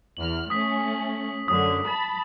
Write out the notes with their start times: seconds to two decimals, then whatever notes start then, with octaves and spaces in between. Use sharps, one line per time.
0.17 E2 F6 F#7
0.50 A3 C#4 D#6 B6
1.48 F#2 D3 D#6
1.87 A5 B5